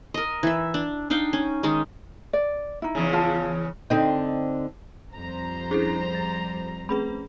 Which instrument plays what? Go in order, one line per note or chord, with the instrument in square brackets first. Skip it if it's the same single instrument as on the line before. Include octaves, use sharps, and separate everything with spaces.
[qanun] A#4 D#5
E3 E5
D4
D4 D#4 F5 G5
C#4
D#3 G#3 D#4
[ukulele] D5
D#4 E4
[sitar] E2 C#3
[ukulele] F4 A5
[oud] D3 C4 D#4
[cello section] F2 G3 [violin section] C5 A#5
[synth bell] C#4 D4 E4 [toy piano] G#4 A4
[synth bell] A6
[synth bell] A3 C4 B4 [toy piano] C#4 G#4 B5